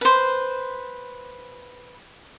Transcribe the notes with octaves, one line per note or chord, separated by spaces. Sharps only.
B4 C5